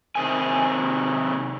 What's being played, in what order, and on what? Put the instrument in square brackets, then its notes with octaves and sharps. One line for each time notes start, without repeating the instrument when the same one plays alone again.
[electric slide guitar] C3 D#3 G#4 G#5